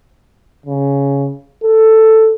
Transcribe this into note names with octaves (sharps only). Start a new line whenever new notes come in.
C#3
A4